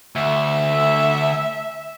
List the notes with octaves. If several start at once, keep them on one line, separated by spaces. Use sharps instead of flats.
D2 E5